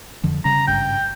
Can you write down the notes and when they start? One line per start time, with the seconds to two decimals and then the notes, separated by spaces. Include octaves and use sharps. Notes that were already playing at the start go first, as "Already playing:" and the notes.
0.23 F2 D3 F3
0.45 C#3 G3 C#4 A#5
0.67 G#1 G2 C#3 G5